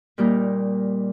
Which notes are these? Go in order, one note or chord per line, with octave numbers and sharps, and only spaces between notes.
A#2 G3 A#3 D#4